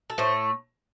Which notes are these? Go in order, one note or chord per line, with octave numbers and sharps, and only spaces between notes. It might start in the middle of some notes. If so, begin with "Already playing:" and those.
A4
A2 A3 C5